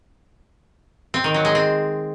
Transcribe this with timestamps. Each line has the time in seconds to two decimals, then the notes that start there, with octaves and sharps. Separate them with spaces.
1.14 C4
1.24 D#3
1.34 F#3
1.45 G#3
1.55 C4